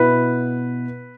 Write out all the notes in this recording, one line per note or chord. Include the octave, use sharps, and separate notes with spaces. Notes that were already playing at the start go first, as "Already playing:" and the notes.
Already playing: B2 B3 E4 B4